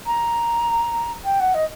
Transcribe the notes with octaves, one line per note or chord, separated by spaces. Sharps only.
A#5
G5
F#5
D#5